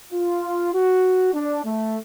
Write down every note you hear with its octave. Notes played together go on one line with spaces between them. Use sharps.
F4
F#4
D4
A3